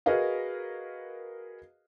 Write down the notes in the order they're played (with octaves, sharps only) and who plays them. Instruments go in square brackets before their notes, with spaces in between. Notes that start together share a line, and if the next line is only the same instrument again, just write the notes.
[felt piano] F#4 G#4 A#4 B4 D#5 F5